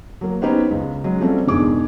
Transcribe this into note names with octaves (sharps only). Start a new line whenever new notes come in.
F#3 A#3
B3 C#4 D#4 G4 B4 C5
C#2 C#3 G#3
F#3 G#3 C#4
F3 G3 A3 C4 C#4 F#4
E1 G2 B2 D#3 G#4 D6